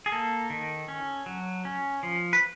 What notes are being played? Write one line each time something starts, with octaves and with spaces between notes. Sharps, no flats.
G#4
A#3 A4
D#3
C#4
F#3
C#4
F3
B4